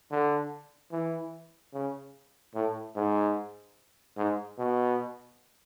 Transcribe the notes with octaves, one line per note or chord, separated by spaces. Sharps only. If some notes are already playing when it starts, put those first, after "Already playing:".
D3
E3
C#3
A2
G#2
G#2
B2